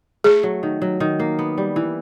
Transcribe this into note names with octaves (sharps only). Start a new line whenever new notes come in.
A3 G#4
F#3
D#3
F#3
D#3
A#3
B3
G3
E3